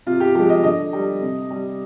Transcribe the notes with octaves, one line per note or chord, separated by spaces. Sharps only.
C3 F4
G4
F3 G#3 G4
D#5
D3 D#5
G3
C3
G3